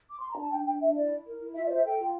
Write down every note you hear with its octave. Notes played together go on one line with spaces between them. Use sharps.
D6
C6
A#5
D4 A5
D4 G5
D4 G5
D4 E5
E4 D5
E4
A#4
E4
F4 E5
D5
C5
E5
A4 G5
F4